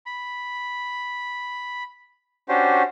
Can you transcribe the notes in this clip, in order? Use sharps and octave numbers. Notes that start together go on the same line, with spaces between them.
B5
C#4 D4 F#4 G4 C5